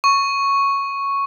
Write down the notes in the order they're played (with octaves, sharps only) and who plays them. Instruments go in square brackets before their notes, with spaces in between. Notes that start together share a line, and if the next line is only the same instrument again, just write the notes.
[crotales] C#6